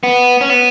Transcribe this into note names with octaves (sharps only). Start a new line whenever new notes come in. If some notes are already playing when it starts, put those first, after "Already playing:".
B3
C#4
B3